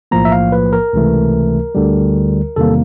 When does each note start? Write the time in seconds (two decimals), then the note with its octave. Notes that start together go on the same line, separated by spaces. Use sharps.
0.11 B1 A2 F3 A#3 A#5
0.25 E5
0.32 F5
0.52 B4
0.73 A#4
0.93 C#2 C3 E3 A3
1.75 D2 D3 G3
2.56 E2 C3 D#3 G3 A#3 A4